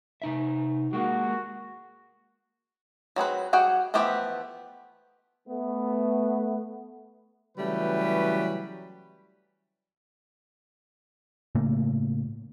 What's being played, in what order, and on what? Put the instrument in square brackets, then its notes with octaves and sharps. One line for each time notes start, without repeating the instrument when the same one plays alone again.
[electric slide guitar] C3 D#4 E5
[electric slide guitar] G#3 A#3 [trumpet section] F#4
[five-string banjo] F#3 C4 G#4 B4
G3 F#4 G#4 F#5 G5
E3 F3 A3 B3 G4
[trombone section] A3 B3
[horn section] C#3 E3 F#3 G3 A3 B4
[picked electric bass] A2 C#3 A3 A#3